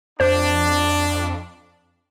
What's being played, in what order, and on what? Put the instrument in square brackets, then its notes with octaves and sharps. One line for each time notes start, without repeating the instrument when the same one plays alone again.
[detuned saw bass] F2 [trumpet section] D4 [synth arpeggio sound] C5